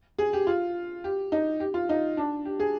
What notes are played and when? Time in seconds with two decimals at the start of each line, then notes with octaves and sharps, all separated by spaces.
0.19 G#4
0.33 G4
0.47 F4
1.04 G4
1.32 D#4
1.60 G4
1.74 F4
1.89 D#4
2.17 D4
2.45 G4
2.60 G#4